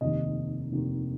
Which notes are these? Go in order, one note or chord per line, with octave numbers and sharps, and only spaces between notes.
F1 D#2 D#3 D#5
F1 D#2 D#3